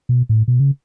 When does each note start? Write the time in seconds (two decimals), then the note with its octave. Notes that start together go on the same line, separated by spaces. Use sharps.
0.09 B2
0.29 A2
0.48 B2
0.60 C#3